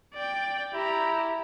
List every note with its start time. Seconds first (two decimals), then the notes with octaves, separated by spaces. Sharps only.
0.15 D5 G5
0.74 E4 G4 A#5